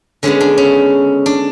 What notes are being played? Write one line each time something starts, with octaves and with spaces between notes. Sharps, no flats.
D3 G#3 B3 C#4
D4
C#4
D4